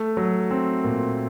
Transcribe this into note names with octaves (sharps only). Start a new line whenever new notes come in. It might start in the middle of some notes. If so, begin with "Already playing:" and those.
Already playing: A3
F#3
C4
A#2